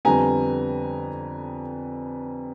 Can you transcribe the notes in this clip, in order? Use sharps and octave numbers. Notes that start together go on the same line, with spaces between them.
F2 D3 G3 B3 G#5 A#5